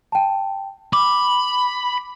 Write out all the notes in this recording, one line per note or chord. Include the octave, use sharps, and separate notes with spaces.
G5 A5
B5 D6